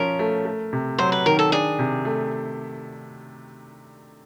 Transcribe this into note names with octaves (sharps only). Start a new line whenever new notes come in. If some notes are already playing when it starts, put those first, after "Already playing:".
Already playing: F3 C#4 A#4
A3
A3
C3
F#3 C5
B4
D#3 A#4
A4
D4 G#4
C3
A3